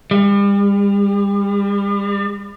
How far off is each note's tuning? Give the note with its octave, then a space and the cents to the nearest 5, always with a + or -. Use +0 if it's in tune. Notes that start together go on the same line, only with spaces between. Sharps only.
G3 +40